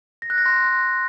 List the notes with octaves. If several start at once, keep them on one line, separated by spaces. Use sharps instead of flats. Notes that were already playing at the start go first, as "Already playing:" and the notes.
A#6
F#6
A#6
C6